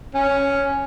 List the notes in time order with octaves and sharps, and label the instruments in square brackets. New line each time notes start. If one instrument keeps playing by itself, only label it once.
[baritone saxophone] C#4